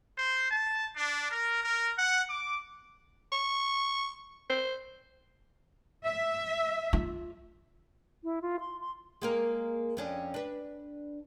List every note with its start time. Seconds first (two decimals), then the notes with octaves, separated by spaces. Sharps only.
0.17 C5
0.51 A5
0.96 D4
1.31 A#4
1.64 A#4
1.98 F#5
2.30 D6
3.32 C#6
4.50 C5
6.05 E5
6.93 F4
8.24 E4
8.42 F4
8.60 C6
8.80 C6
9.22 G#3 A#3 A#4
9.97 F2 C#4 D4
10.34 D4 B4